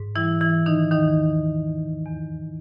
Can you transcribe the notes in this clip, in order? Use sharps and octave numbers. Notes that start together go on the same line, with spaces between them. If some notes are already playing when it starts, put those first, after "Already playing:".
Already playing: G#2
E3 G3 E4
E3 E4
A#2
D#3 D#4
D#2 D#3 D#4
D#2
E2
E2